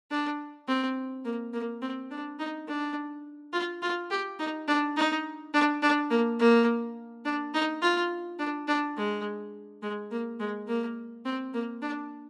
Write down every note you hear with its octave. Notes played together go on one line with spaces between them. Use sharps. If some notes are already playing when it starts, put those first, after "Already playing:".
D4
C4
A#3
A#3
C4
D4
D#4
D4
F4
F4
G4
D#4
D4
D#4
D4
D4
A#3
A#3
D4
D#4
F4
D4
D4
G#3
G#3
A#3
G#3
A#3
C4
A#3
D4